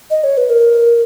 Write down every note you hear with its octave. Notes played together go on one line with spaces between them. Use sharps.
D#5
C#5
B4
A#4